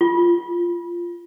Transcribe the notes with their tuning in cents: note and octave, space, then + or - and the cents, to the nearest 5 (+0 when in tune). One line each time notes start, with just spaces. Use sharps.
F4 -15